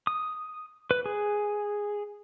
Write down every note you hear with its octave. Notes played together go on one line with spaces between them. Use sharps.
D#6
B4
G#4